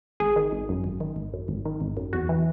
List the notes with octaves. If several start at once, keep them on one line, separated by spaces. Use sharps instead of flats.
G#1 G#4
D#3
G#1
F#2
G#1
D#3
G#1
F#2
G#1
D#3
G#1
F#2
E2 F#4
E3